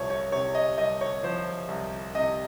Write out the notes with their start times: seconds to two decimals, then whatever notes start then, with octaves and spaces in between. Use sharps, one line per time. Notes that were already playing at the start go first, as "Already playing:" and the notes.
Already playing: C2 F3 C#5
0.10 C#5
0.32 C3 C#5
0.55 D#5
0.78 C2 D#5
1.01 C#5
1.23 F3 C5
1.68 C2
2.14 C3 D#5